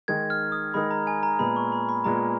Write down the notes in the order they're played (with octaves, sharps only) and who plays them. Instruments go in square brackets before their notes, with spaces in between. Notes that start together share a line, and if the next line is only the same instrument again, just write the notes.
[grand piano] D#3 G#3 D#4 A#4 [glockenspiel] G#6
[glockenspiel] F6
D#6
[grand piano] D#3 G#3 D#4 A#4 [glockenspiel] B5
[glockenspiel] A#5
G#5
A#5
[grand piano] A#2 G#3 B3 [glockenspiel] B5
[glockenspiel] C#6
B5
B5
[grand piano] A#2 G#3 B3 [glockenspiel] A#5